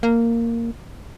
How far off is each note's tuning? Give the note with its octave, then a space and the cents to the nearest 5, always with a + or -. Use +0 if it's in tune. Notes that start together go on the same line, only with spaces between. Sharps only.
A#3 -10